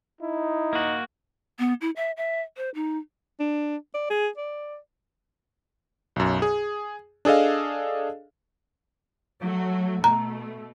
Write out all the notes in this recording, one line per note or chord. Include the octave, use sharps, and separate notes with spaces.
D#4 E4
A#3 F#4
B3
E4
E5
E5
C5
D#4
D4
D5
G#4
D5
B1 F#2
G#4
D4 G#4 A4 D#5 F5
F#3 A3 F#4
B2 A3 A#5